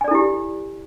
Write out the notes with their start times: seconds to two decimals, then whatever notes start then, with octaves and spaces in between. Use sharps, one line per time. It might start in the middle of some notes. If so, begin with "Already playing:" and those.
0.01 G#5
0.04 D5
0.08 A4
0.11 E4
0.15 G4